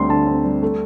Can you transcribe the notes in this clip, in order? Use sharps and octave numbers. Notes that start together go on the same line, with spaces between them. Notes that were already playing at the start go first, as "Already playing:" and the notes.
Already playing: D2 G3 C4 C6
D3 A5
C4
G3
A3